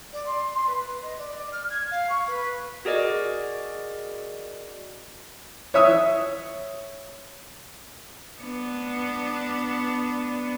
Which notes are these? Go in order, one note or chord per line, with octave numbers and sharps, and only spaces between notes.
D5
C6
C6
B4
D#5
D5
F6
G#6
F5
C#6
B4
F#4 G#4 A#4 D5 D#5
C#5 E5 D#6 E6
B3 D4